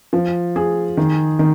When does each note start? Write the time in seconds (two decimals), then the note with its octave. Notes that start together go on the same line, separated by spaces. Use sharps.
0.13 F3
0.56 G#4
0.97 D#3
1.39 D#3